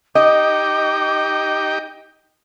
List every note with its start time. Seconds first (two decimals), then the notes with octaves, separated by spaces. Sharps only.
0.15 D#4 G4 D#5 G5 D6